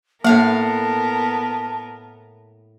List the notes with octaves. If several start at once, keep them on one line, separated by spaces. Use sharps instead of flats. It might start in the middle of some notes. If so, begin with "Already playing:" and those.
A2 A#3 B3 A#4 F5 F#5 A5